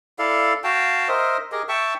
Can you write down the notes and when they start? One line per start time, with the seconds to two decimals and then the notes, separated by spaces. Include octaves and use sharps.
0.19 E4 A4 D5 F5
0.64 F#4 F5 G5 A5
1.08 A#4 C5 D#5 E5
1.52 G4 G#4 A#4 D#5
1.69 E5 G5 A5 C#6